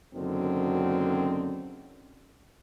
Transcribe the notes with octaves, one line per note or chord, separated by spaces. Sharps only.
F#1 F#2 D3 D#3 F#3 C4